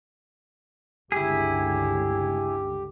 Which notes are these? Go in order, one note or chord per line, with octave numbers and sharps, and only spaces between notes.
G1 C#2 D3 E4 G4 G#4